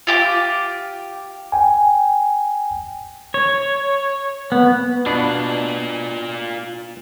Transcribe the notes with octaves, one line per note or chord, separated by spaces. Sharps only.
F4 G4 D6
G5 G#5
C#5
B3
B2 B3 D4 F4 D5